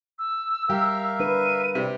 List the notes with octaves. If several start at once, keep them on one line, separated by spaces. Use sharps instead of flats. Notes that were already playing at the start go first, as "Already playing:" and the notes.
E6
G3 G4 A#4 E5 F5
D4 B4 D#7
C3 G3